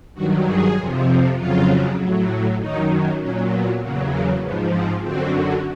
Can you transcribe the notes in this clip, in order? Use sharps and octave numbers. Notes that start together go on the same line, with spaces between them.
G2 D#3 F#3 F#4
G#4
F2 C3 F3
F2 C#3 F#3 F4
A2 F#3
F#2 D#3 F#3 D#4
A#2 F#3 C#4
B3
E2 C#3 F#3 A#3
A#3
G#2 F3 B3
C4
F#2 D3 F#3 C4